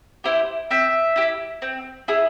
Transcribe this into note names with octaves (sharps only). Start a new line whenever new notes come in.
E4 G4 C5
C4 E5
E4 G4
C4
E4 G#4